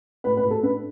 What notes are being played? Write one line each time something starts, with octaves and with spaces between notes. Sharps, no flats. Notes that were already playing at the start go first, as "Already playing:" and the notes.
A2 B4
B4
A2
A4
D4 B4